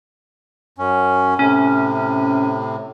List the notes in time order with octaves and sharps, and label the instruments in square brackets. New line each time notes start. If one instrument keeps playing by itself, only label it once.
[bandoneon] F#2 C#4
[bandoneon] A2 C3 [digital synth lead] C#4